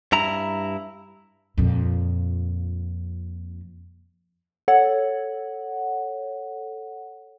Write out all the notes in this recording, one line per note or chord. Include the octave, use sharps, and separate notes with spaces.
G2 E4 A#5
F2 A#2
A4 C#5 F#5